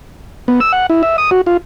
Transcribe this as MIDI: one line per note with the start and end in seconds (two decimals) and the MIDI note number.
0.48 0.60 59
0.60 0.72 88
0.73 0.86 78
0.90 1.02 64
1.03 1.17 76
1.18 1.30 87
1.31 1.41 66
1.46 1.57 65